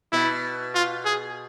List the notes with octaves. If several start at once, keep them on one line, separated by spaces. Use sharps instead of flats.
B2 E4
F4
G#4